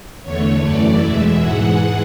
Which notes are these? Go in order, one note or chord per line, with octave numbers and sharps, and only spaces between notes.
E2 D3 A3 C#5
F#2 E3 A3 D5
E2 B2 G#3 E5
G#2 E3 G#3 F#5